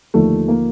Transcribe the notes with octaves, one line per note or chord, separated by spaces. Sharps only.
D#2 D3 F3 A3
A#3